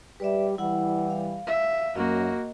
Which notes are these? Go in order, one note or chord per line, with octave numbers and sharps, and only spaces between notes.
G3 G4 B4 D5 E5
E3 G3 E4 F#5
F5
E5
F#2 A#3 F#4 D#5